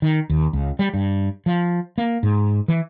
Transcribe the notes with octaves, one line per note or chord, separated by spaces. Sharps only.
D#3
D#2
C#2
G3
G2
F3
A#3
G#2
E3